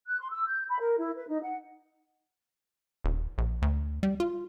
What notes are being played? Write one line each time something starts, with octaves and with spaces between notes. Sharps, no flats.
F#6
C6
E6
G6
B5
A#4
E4
B4
D#4
F#5
D#1
A#1
D2
G3
F4